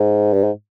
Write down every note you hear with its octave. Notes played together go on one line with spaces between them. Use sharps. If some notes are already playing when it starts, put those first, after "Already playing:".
Already playing: G#2
G2
G#2